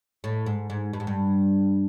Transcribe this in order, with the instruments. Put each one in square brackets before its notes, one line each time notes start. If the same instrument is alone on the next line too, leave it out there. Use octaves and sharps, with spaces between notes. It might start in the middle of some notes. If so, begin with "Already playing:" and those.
[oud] A2
G#2
G#2
G2
G#2
G2